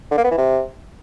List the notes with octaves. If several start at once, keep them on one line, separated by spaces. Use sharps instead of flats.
D3
A#3
B3
E3
C3